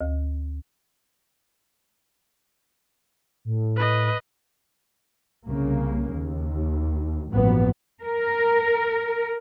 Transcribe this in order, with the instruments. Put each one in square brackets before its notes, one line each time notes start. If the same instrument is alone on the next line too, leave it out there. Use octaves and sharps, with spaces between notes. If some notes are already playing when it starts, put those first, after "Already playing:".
[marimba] D2
[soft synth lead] A2
[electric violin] B4 D#5
[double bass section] C2 C#3 A#3
D#2
A1 G2 A#2 F3 F#3 B3
[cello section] A#4